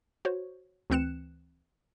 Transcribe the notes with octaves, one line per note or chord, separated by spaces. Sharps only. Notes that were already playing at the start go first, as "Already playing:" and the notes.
F#4 C5 C#5
D2 E3 C4 F#6 C#7 E7